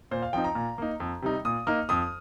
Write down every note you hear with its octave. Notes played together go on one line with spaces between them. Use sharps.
A#2 C5
F5
F3 C4 D#4 G5
A#5
A#2
A#3 D#4
F2
C3 G3 D#4
A#2 D#6
A#3 D#4 F6
F2 D#6